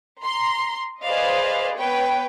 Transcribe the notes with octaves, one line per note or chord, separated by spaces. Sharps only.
A#5 C6
G#4 B4 C5 D5 D#5 F5
B3 B4 C#5 G5